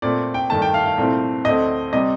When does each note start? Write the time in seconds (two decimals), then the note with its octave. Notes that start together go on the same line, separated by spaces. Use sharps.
0.02 A#2 A3 C4 D5
0.34 G5
0.50 G2 D#3 A3 A5
0.62 G5
0.74 F5
0.86 F5
0.98 C2 A#2 A3 C4
1.45 D2 D3 A3 C4 D#5
1.93 C3 G3 C4 D#5